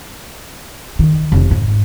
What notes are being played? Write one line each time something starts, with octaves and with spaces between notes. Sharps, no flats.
D#3
F1
G#2